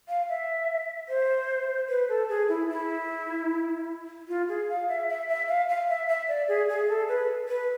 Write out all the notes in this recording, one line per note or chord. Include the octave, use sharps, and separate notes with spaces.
F5
E5
C5
B4
A4
G#4
E4
E4
F4
G#4
F5
E5
E5
E5
F5
F5
E5
E5
D5
G#4
G#4
A4
B4
B4